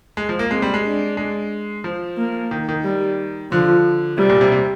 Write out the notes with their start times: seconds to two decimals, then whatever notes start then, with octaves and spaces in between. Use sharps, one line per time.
0.17 G#3
0.29 F3
0.39 A#3
0.51 G#3 C4
0.62 G3
0.74 G#3
0.85 D4
1.17 G#3
1.84 F3
2.18 A#3
2.51 D#3
2.69 D#3
2.85 G3
3.51 D3 F3
4.18 C3 G3
4.30 A#2
4.41 C3
4.52 C3